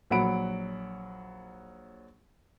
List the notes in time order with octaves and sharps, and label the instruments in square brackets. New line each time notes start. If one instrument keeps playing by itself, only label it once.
[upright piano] A#1 F#3 F#5 B5 D7